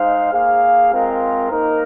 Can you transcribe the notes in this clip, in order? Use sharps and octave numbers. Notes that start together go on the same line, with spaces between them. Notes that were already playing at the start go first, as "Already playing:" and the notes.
Already playing: G#3 D#4 C5 F5
A#3 G#4 F5
G#3 C4 F4 A#4
A#3 D#4 A#4